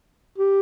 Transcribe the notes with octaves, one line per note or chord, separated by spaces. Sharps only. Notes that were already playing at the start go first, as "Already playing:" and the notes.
G4